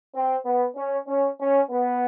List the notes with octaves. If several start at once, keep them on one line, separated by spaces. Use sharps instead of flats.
C4
B3
C#4
C#4
C#4
B3